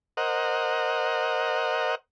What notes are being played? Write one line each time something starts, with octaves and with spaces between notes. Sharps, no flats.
A#4 C5 D#5 F#5